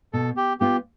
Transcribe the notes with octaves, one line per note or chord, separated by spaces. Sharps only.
B2 A4
G4
B3 F4 G4